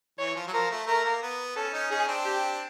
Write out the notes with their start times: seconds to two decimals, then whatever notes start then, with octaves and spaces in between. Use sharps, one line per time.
0.19 E3 C#5
0.36 F3
0.47 F#3
0.53 F3 A#4
0.71 A3
0.87 A3 A#4
1.05 A#3
1.22 B3
1.56 C#4 A4
1.73 C#4 D#4
1.90 C#4 D#4 G#4
2.08 C4 D4
2.25 G4